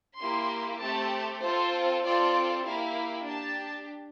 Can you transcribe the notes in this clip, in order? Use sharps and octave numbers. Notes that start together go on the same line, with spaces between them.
A#3 E4 G4 C6
A3 C4 G4 A5
C4 F4 A4 C5
C4 F4 A4 D5
A#3 E4 G4 F5
D4 G4 A5